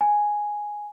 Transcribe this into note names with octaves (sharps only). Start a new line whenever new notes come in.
G#5